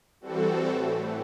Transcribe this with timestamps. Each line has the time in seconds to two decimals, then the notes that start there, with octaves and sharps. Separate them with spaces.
0.21 E3 G3 C4 F#4 A4
0.68 A2 E3 A3